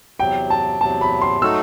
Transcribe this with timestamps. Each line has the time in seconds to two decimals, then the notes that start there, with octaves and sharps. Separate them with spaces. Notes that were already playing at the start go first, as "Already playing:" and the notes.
0.20 E2 C3 F#3 G5
0.50 A5
0.80 E2 C3 F#3 A5
1.01 B5
1.22 C6
1.42 F#3 A3 D#4 F#4 A4 E6